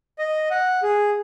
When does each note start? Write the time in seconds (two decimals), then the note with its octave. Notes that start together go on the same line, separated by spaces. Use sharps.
0.19 D#5
0.50 F#5
0.83 G#4